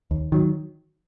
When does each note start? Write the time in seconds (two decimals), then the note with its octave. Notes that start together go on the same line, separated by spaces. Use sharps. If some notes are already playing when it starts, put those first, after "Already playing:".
0.11 D#2
0.32 D#3 F#3